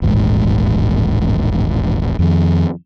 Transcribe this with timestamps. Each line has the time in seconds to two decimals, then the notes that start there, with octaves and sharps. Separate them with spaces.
0.02 D#1 A1 G#2
2.19 F2 D#3